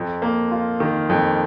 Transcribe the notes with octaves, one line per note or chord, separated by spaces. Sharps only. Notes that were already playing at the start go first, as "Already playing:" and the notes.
Already playing: F2
A#3
F4
D#3
F2